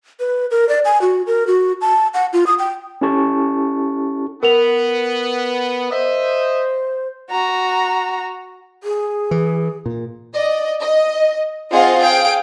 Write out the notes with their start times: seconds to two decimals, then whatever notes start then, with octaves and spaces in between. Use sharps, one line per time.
0.20 B4
0.51 A#4
0.69 D5
0.85 G#5
1.02 F#4
1.27 A#4
1.47 F#4
1.81 A5
2.14 F#5
2.33 F4
2.47 D#6
2.59 G5
3.01 C#4 E4 G4 A4 A5 C#6
4.43 B3 A#4 F7
5.91 C5 D#5 E5
7.30 F#4 A#5
8.83 G#4
9.31 E3
9.86 A#2
10.33 D5 D#5
10.81 D#5
11.70 C4 F4 G#4 D#5 F5 F#5
11.99 G#4 F5 G5 D7